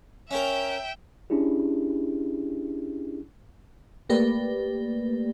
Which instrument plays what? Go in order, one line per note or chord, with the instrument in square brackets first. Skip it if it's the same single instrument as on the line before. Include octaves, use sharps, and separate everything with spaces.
[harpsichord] C#4 A#4 [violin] E5 G5
[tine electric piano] C#4 D4 E4 G4 G#4
[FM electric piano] A3 A#3 G4 B4 D5